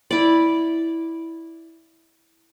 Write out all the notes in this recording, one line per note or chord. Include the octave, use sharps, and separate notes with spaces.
E4 D5